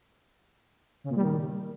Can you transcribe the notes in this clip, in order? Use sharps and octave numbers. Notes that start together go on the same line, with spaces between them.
C#3
A#2
G3
D#3